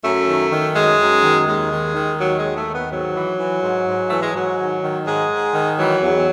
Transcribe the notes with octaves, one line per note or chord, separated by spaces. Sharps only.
F#2 A3
D#3
D#3
F#2 G#3
F#2
D#3
D#2 G#3
D#3
D#3
D#2 F#3
G#3
D#2
A3
D#3
B3
G#2 F#3
E3
E3
G#2
G#2
E3 A3
G#3
G#2 F#3
D#3
D#3
G#2 G#3
G#2
D#3
E3 F#3
E2